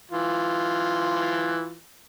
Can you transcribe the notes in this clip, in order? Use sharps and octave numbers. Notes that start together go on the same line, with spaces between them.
E3 F4